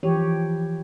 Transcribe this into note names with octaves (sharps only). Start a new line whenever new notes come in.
E3 F3 G4 C#5